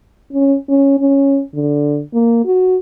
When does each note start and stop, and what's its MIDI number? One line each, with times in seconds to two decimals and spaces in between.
0.33 0.56 61
0.69 0.97 61
1.00 1.41 61
1.54 2.01 50
2.13 2.41 58
2.45 2.77 66